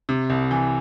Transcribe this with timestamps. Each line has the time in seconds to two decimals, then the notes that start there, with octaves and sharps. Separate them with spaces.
0.09 C3
0.30 C2
0.51 E3